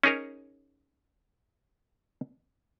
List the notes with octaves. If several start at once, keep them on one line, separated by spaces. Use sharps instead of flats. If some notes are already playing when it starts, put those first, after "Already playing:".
C#4 D#4 G#4 A#4 C#5